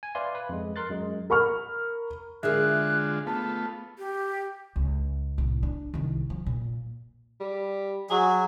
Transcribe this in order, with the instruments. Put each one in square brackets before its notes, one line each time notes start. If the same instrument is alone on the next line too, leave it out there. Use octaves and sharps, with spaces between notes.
[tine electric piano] G#5
B4 D5 E5 F5 G#5 C6
B4
F2 G#3
A#4 C6 F#6 A6
F#2 G#3
[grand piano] A#4 B5 C#6 F6
[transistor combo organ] D3 G#3 F4 [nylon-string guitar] G#4 A#4 E5 [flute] F#6
[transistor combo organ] A3 B3 F4 [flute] A5
[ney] G4
[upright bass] C#2
C2 A2
D4
C2 D#3
F3
A#2
[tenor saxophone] G3
[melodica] F#3 [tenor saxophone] G#4